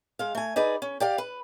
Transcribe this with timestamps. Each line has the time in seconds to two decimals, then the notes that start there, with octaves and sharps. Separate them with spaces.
0.19 G#3 F5
0.35 A3 G#5
0.56 D#4 G#4 B4 D5
0.82 C#4
1.00 G4 D5 F5
1.18 B4